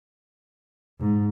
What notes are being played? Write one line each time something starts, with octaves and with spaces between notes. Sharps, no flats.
G#2